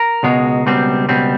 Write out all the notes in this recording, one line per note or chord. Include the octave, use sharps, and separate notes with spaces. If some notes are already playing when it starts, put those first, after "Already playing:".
Already playing: A#4
C#2 B2 G#3
C#2 B2 G3 C4
C#2 B2 G3 C4